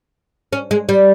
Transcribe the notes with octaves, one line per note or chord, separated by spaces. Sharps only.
C#4
G#3
G3